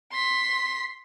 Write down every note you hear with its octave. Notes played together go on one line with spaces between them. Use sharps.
C6 B6